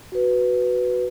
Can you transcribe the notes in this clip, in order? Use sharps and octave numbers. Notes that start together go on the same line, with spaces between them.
F#4 B4